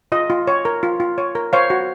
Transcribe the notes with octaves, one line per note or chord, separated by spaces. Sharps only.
F4 D#5
F4
C#5
A#4
F4
F4
C#5
A#4
C5 C#5 F5
F#4